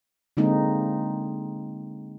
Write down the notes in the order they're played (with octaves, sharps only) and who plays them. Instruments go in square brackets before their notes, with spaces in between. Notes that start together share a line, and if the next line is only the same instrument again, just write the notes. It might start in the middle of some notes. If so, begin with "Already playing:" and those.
[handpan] D3 G#3 A#3 C4 D#4